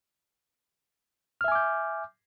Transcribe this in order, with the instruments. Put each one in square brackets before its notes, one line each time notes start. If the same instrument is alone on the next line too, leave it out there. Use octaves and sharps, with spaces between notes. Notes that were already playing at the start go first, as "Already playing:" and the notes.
[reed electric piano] F6
E5
G#5
D6
G6